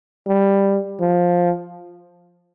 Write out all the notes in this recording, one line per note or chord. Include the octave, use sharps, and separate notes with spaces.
G3
F3